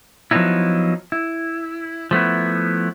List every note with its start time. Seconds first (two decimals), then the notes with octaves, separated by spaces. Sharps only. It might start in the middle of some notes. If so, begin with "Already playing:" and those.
0.31 F3 F#3 B3 C#4 D#4 E4
1.12 E4
2.11 F3 A3 B3 E4